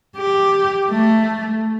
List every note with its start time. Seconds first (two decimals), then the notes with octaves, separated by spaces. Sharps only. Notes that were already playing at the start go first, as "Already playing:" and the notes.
0.17 G4
0.91 A3